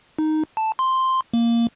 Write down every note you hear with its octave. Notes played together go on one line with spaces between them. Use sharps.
D#4
A5
C6
A#3